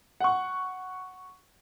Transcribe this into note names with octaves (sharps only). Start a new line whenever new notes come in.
F#5 C#6